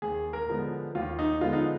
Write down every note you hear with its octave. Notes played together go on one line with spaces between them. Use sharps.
D#2 G#4
A#4
D3 F3 G#3 B3
D#2 F4
D#4
D3 F3 G#3 B3 F4
D#4